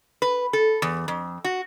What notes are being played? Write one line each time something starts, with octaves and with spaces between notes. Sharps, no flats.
B4
A4
E2
F2
F#4